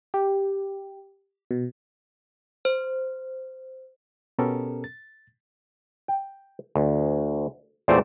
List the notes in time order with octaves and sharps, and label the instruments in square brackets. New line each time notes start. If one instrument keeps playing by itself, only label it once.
[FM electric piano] G4
B2
[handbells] C5
[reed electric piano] B2 B3 C#4 G4 A4 A#4
A6
[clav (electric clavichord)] G5
D2
E2 A#2 A3 C4 C5 D5